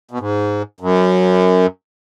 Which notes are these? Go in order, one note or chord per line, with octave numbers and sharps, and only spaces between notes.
B2
G#2
F#2